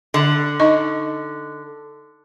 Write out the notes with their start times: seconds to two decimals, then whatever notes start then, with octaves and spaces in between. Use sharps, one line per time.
0.14 D3
0.60 D#4 D#5 C#6